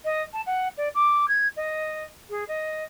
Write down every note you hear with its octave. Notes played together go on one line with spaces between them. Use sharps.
D#5
A5
F#5
D5
D6
G#6
D#5
G#4
D#5